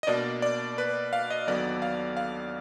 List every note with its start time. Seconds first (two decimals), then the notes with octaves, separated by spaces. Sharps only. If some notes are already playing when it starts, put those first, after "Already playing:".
0.03 D#5
0.07 B2 A#3 D4 D5
0.42 D5
0.78 B4
1.13 F5
1.30 D#5
1.47 D#2 D3 F#3 B3 D5
1.82 F5
2.17 F5